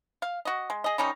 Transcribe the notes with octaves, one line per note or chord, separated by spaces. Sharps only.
F5
F#4 D#5
G#3
G#4 D#5
D#3 G3 C#4 D#4